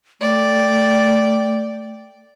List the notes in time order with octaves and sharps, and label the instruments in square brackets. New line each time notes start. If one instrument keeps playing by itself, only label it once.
[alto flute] A3 [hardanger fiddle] D5 G5